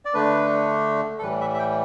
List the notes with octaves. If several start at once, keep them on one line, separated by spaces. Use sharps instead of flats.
D5
D3 A3 D4 B4
A4
A2 E3 G3 B4
E5
E5
G5